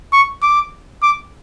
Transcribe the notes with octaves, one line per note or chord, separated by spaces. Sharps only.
C#6
D6
D6